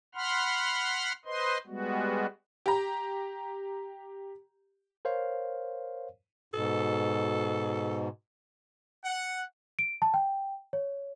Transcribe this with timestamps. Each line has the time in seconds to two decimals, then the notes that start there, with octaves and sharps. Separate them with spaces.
0.15 F#5 B5 C6 F6
1.25 B4 C5 D#5 C6
1.67 G3 G#3 B3 F#4
2.66 G4 A#5
5.05 A#4 C5 C#5 F5
6.54 G#2 B2 A4
9.04 F#5
9.79 D7
10.02 A5
10.14 G5
10.73 C#5